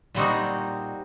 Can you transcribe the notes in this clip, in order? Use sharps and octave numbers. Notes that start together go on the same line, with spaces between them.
A#2 G3 C4 D#4 F#4